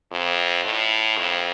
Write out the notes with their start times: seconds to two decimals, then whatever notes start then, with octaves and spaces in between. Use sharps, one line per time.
0.12 F2
0.65 A2
1.18 F2